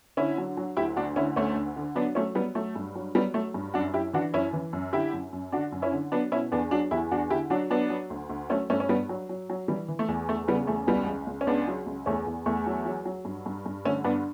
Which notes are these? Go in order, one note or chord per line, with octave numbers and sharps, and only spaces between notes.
D3 C#4 E4
F#3
F#3
D2 E4 G4
D2 D4 F#4
D3 C#4 E4
D2 A3 C#4
D2
D3
F#3 B3 D4
F#3 A3 C#4
F#3 G3 B3
F#3 A3
G2
F#3
F#3 G3 B3
F#3 A3
G2
F#2 D4 F#4
F#2 E4 G4
E3 D4 F#4
F#2 C#4 E4
E3
F#2
D3 E4 G4
F#2
F#2
D3 D4 F#4
F#2
C#4 E4
D3
F#3 B3 D4
B2 C#4 E4
E2 B3 D4
F#3 D4 F#4
E2 E4 G4
E2 D4 F#4
D3 E4 G4
F#3 D4 F#4
F#3 B3 D4
F#3
D2
D2
F#3 A3 C#4
G2 A3 C#4
C#4
G2 G3 B3
F#3
F#3
F#3
E3 G3
E3
A3
E2
E2 A3
C#3 G3 B3
E2 A3
C#2 G3 B3
C#2
C#2
C#4
C#2 B3 D4
F#3
C#2
E2 A3 C#4
E2
E2 A3
F#3
F#3
F#3
G2
G2
G2
D3 A3 C#4
G2 B3 D4